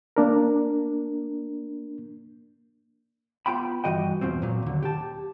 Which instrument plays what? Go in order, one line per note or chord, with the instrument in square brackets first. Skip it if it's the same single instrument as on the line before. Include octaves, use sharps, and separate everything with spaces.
[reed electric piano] A#3 D4 A#4
[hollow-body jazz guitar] B3 F4 G5 B5
G2 E3 F#4 D#5 G5
E2 B2 F3 C4
A#2 F#3
D#2 D3
G4 A5